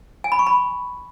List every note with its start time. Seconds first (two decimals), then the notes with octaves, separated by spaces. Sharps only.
0.24 G#5
0.32 B5
0.39 C#6
0.46 B5